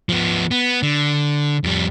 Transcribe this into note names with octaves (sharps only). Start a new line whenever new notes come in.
F3 B3
B3
D3
F2 G3